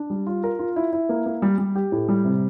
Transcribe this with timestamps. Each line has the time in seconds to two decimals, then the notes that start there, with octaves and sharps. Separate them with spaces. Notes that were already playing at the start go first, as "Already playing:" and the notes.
Already playing: D4
0.10 G3
0.27 F4
0.44 A#4
0.59 F4
0.76 E4
0.93 E4
1.09 A#3
1.26 A#3
1.42 G3
1.58 G3
1.75 G4
1.92 A2
2.09 G3
2.25 C3